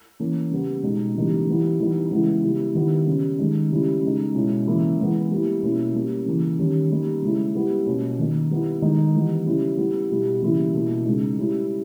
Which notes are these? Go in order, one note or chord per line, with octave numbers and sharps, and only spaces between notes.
E3 A#3 C#4
C#3 G3 B3
B2 G#3 D#4
C#3 E3 G3 A#3 D#4
E3 G3 B3 E4
E3 G3 B3 D#4
C#3 E3 G#3 B3 E4
C#3 G3 B3 E4
D#3 G3 B3 E4
C#3 G3 C#4
D#3 G#3 D#4
C#3 G3 C#4 E4
C#3 G#3 D#4
B2 G#3 C#4 E4
C#3 E3 A#3 C#4 E4
E3 G#3 B3
G3 A#3 E4
B2 A#3 C#4 E4
G3 A#3 C#4
C#3 E3 A#3
D#3 G3 C#4
G3 A#3 D#4
C#3 G#3 C#4 E4
G3 B3 E4
B2 A#3 C#4
D#3 A#3 D#4
G3 B3 E4
D#3 G#3 D#4
E3 G3 B3
C#3 G3 C#4 E4
G3 B3 E4
B2 G3 B3 E4
C#3 E3 G3 A#3 E4
B2 A#3 E4
C#3 G#3 D#4
G3 C#4 E4